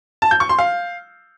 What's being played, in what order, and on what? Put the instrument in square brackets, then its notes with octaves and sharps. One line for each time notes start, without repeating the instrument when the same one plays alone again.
[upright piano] A5
G6
C#6
C6
F5